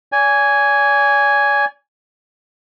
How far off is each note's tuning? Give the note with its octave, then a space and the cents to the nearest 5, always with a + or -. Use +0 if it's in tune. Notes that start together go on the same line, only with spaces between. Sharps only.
D5 -40 G#5 +0